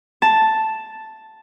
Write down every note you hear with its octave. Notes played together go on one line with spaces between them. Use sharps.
A5